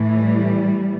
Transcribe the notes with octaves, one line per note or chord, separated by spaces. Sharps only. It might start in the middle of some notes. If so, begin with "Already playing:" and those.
Already playing: A2 E3
G3